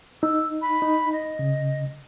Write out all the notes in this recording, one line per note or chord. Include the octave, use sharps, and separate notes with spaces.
D#4 E6
B5
D#4
D#5
C#3